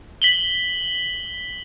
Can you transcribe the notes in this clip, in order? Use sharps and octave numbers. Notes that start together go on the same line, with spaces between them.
B6 F#7 G7